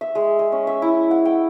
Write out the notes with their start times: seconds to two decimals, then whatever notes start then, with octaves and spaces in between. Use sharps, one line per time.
0.01 E5
0.15 G#3
0.39 G#3
0.52 C#4
0.67 E5
0.82 E4
1.11 F#5
1.25 G5